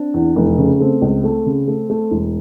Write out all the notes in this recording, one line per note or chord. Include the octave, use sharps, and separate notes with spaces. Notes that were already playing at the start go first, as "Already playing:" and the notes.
Already playing: C4 D4
E2
F1
C#3
A3 C4
C#2
A3
C#3
A3
A3
E1